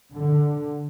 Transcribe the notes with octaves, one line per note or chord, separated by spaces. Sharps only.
D3